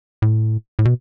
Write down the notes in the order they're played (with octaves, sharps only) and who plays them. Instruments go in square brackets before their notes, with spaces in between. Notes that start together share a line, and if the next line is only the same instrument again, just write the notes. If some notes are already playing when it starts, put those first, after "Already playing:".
[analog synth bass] A2
A2
B2